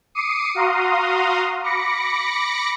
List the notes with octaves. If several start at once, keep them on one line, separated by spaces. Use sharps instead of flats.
D6 D#6 C7 C#7 D#7
F#4 F5 A#5 C6 D#6
B5 D6 A#6 C#7